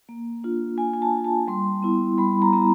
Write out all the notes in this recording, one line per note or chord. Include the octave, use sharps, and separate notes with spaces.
A#3
D4 F4
A#3 G#5
G#5
A5
D4 F4
A5
G3 C6
B3 E4
G3 B5
A#5
B3 E4 A#5